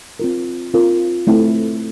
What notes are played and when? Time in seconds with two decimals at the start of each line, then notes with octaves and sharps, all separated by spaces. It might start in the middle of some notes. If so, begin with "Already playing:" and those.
0.20 C4 F4 A#4
0.74 C4 F4 A#4
1.27 A3 C4 E4